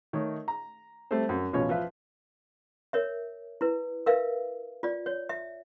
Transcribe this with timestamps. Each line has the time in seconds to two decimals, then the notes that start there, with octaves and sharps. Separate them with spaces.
0.13 D#3 A3 D#4 C#5
0.48 A#5
1.11 G3 A3 C4 A4 C5
1.29 F#2
1.53 A1 B2 C#4 F4 C#5
1.69 F3 F4 B4 E5
2.93 A#4 C#5 E5
3.61 E4 B4
4.06 A#4 B4 E5 F5
4.83 F4 D5
5.06 C#5
5.29 E5